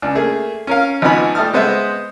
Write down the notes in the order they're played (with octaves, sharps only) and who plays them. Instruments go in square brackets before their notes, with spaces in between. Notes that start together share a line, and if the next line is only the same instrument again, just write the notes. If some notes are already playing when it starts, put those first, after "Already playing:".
[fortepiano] C#2 D4
A3 A#3 G#4
C#4 A#4 F5
G#1 F3 B3 D#4 G#5 B5
G3 A3 A5 D#6 F6
G#3 B3 C5 D#5 E5